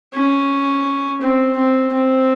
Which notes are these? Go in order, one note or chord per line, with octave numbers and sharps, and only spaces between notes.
C#4
C4
C4
C4